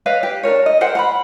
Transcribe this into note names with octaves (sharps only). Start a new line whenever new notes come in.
B4 C#5 D#5 F5
G4
D4 F#4 A#4 C#5
D#5
A#4 C5 F#5 G5
F#5 A#5 B5